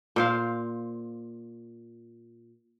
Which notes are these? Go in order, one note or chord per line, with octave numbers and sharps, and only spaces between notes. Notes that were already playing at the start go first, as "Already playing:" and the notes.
A#2 C5 F5